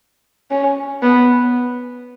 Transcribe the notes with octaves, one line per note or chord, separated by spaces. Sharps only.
C#4
B3